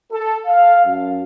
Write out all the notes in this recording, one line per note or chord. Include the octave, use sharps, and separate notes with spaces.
A4
F5
F#2